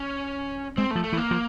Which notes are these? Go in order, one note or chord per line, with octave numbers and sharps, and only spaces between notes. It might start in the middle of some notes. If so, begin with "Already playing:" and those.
Already playing: C#4
G#3 C4
A3
F3
A3
E3
A#3
F3